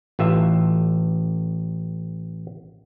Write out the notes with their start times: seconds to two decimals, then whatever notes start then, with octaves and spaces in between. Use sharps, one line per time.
0.19 A1 F4 E5